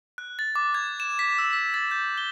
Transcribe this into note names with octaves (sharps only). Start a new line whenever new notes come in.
F#6
A6
D6
G#6
E7
B6
E6
B6
A6
G6
G7